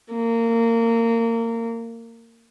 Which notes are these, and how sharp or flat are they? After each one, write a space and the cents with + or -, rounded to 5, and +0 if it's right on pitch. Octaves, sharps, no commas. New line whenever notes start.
A#3 -25